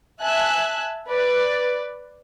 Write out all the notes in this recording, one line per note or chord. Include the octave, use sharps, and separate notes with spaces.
E5 G#5 A5 F#6
B4 D5